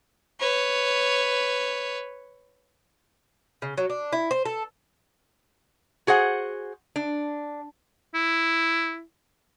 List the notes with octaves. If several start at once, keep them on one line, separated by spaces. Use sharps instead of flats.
B4 C#5
C#3
F#3
D4
E4
C5
A4
F#4 G#4 C5 F#5
D4
E4